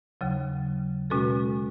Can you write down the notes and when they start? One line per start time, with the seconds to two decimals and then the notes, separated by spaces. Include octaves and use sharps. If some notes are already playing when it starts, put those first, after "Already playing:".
0.21 D#2 C#3 F#3
1.10 B2 G#3 C#4 F#4 A4